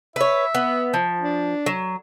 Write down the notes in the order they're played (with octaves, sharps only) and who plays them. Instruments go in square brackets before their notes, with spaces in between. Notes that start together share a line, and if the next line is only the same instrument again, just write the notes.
[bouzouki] B4 C#5 [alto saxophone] E5
[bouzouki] B3
F3
[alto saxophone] D4
[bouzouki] F#3